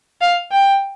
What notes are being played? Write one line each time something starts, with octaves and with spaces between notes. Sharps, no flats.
F5
G5